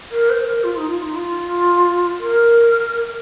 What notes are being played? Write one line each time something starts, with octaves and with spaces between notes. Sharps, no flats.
A#4
C5
A#4
F4
D#4
F4
D#4
F4
A#4